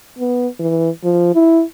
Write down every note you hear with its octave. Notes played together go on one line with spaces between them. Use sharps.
B3
E3
F3
E4